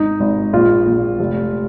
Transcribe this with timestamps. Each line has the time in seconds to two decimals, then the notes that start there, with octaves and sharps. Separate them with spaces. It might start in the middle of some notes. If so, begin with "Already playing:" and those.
Already playing: G#1 D#4
0.20 G#1
0.53 A#1 F4
0.86 A#1
1.19 F1